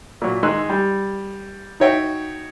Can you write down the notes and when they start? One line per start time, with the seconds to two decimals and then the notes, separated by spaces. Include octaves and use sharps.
0.22 A#2 F#3
0.43 D#3 G#3 D#4 C6 E6 F#6
0.69 G3
1.80 D#4 F#4 C#5 E5 G5